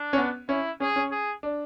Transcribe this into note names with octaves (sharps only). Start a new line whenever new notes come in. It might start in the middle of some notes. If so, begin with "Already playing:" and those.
Already playing: D4
C#4
B3
C#4 E4
C#4 G#4
C#4
G#4
D4